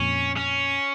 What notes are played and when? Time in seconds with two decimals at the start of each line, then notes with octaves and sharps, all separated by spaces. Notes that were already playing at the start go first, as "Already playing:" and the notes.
Already playing: F2 A#2 C#4
0.37 C#4